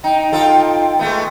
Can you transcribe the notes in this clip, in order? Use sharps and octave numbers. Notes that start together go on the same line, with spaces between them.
D#4 G5
D#4 F4 A4
G#3 A3 B3